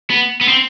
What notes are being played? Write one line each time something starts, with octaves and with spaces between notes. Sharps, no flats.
B3
B3
C4